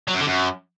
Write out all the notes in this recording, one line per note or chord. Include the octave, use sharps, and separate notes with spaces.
F#3
F#2
D3
F#2